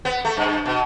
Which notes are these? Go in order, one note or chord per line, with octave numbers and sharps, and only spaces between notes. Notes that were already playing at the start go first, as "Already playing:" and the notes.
B3
A3
G2
B2